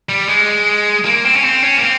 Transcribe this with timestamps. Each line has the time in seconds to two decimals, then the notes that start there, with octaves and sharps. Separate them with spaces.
0.09 G3
0.29 G#3
1.05 A#3
1.25 C4
1.36 C#4
1.44 C4
1.63 C#4
1.77 A#3
1.82 C4